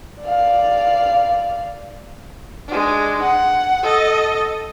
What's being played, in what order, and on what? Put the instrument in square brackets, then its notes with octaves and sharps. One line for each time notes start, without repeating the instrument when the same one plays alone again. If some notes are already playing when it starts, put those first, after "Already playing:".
[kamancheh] D5 F5
G#3 D4
F#5
A4 D#5